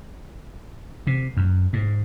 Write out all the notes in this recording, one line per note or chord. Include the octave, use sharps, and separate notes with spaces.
C3
F#2
G#2